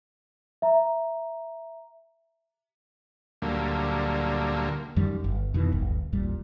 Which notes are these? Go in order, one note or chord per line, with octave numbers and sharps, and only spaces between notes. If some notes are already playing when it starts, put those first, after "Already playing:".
E5 A#5
D2 A#2 D3 F#3 G3 A#3
F#2 D#3 G3
G1
F2 B2 D#3 E3
D1 G1
D#1 A1 A#2 G3